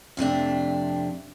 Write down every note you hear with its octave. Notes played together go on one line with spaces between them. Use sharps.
F2 C3 A3 D4